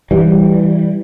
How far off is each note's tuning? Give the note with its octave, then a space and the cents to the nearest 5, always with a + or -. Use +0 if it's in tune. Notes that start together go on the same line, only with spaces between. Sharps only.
E3 +0 G3 +0